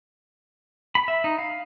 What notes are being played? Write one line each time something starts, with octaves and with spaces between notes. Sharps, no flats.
B5
E5
D#4
F5